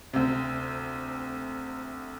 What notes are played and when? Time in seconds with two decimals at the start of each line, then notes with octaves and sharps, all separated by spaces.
0.13 D2 C3